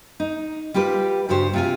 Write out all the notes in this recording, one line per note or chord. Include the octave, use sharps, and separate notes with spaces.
D#4
G3 F4 G4 B4
G2 C#3 F#4 G4 C5
C3 F4 G#5